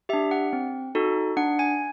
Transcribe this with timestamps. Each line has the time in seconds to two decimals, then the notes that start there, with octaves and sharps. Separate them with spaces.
0.09 G4 E5
0.13 D4
0.31 F#5
0.53 C4
0.95 D#4 F#4 A4
1.37 D4 F#5
1.59 G#5